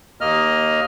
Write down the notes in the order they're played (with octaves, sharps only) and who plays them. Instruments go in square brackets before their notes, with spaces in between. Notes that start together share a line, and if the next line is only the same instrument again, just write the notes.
[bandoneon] D#2 A#3 D#5 F6